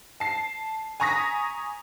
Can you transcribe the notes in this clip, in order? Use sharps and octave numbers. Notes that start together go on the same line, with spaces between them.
A5 C7
G#5 A#5 C#6 D#6 A#6 B6